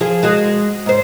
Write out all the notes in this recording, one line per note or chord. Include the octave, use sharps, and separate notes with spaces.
F3 G#4
G#3 F#4 G#4
G#2 C5